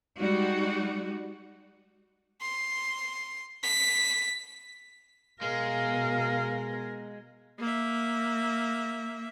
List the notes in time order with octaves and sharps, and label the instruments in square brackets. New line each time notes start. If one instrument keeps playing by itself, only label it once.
[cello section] G3 G#3 D#4 F#4
[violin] C6
B6
[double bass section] B2 [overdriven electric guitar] G#3 [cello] A#4 [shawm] F5
[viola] A#3 E5